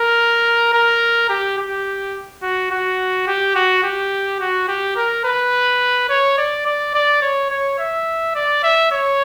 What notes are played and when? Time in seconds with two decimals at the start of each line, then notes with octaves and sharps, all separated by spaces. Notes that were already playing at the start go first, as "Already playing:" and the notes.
Already playing: A#4
0.73 A#4
1.30 G4
1.58 G4
2.42 F#4
2.71 F#4
3.27 G4
3.55 F#4
3.84 G4
4.40 F#4
4.68 G4
4.96 A#4
5.25 B4
6.09 C#5
6.38 D5
6.66 D5
6.94 D5
7.22 C#5
7.50 C#5
7.78 E5
8.35 D5
8.63 E5
8.91 C#5